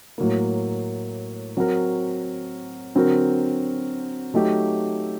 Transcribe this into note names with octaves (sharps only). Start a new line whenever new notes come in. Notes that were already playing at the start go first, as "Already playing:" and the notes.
A2 F#3 A#3
F#3 C4 F#4 A#4
D3 F#3 C4 F#4 A#4
F#3 A3 D#4 G4